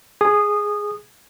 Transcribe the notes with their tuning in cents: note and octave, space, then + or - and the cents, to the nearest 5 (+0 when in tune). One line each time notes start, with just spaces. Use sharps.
G#4 +0 D#6 -20